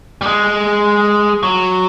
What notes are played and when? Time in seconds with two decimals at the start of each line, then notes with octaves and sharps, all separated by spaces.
0.21 G3
0.26 G#3
1.43 F#3